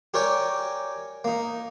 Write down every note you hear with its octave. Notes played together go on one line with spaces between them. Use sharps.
G4 A#4 C#5 D5 G5 G#5
A#3 D#4